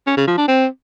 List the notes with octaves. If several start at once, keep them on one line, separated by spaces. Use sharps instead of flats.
C#4
C#3
F3
D4
C4